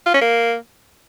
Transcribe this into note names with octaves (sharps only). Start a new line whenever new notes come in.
F4
C#4
A#3